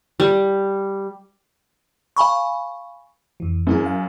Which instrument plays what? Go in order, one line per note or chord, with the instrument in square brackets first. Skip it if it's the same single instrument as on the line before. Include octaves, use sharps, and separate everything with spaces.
[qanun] G3
[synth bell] F5 G#5 B5 C#6
[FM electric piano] F2 E3
[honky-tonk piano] F#2 [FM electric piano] B3 E4 G#4
[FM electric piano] F5